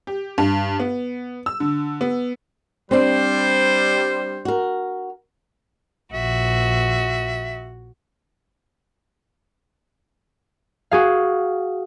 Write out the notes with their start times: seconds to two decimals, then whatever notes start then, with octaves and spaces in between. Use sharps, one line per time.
0.07 G4
0.38 G2
0.80 B3
1.46 E6
1.60 D3
2.01 B3
2.91 G3 C4 D4 C5
4.45 F#4 A#4
6.13 A#1 F#4 E5
10.91 F#4 G#4 F5